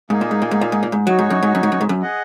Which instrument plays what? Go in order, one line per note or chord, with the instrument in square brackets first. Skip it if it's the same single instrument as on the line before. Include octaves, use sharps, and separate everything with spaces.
[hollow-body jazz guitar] G#2 [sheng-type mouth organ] A#3 D#4 G#4
[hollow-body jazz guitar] A#2
G#2
A#2
G#2
A#2
G#2
A#2
G#2
[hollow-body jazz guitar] F#3 [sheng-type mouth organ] D#4 F#4 C#5
[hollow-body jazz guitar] G#2
F#2
G#2
F#2
G#2
F#2
G#2
F#2
[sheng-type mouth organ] G#4 D#5 F#5